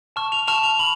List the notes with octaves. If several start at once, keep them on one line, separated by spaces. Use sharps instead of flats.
A5 C#6 F6
F7
A5 C#6 F6 F7
F7
B5 F#7